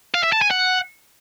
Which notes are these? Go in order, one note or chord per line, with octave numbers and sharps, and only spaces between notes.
F5
E5
A5
G#5
F#5